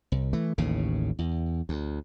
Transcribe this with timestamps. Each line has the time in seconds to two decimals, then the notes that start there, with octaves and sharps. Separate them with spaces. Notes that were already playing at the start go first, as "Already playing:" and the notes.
0.12 C2
0.33 E3 A3
0.58 A1 D#2 A2 C#3
1.19 E2
1.69 D2